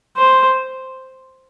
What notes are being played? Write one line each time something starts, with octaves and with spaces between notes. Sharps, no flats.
C5